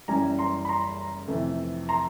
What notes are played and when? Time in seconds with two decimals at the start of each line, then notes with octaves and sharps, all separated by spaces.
0.08 F#1 F#2 C#3 E3 G3 G#5 A#5
0.39 A#5 C6
0.65 B5
0.69 A#5 C6
1.28 F2 C3 E3 A3
1.89 A#5 C6